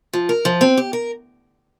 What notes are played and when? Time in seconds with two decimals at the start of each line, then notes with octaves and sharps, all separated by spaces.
0.13 F3
0.29 A#4
0.45 F3
0.61 C4
0.77 G4
0.93 A#4